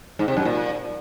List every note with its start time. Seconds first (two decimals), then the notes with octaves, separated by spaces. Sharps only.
0.19 G#2
0.28 C3
0.37 F#2
0.45 A#2